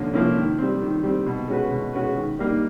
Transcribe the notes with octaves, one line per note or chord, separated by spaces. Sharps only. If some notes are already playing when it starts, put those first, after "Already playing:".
Already playing: D3 F3 A#3 C#4
F3 A#3 C#4 E4
D#3
G3 C4
D#3
G3 C4
B2
G#3 C#4 F#4 B4
B2
G#3 C#4 F#4 B4
D#3
G3 A#3 D#4